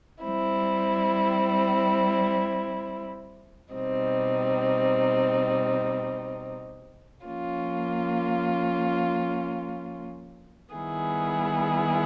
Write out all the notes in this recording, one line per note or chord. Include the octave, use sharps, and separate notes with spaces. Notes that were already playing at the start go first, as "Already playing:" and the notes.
G3 C4 E4
B2 G3 C4 D#4
F3 A#3 C#4 F4
D#3 G3 B3 E4 G#4